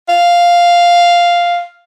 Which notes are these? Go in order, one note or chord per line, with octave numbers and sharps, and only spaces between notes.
F5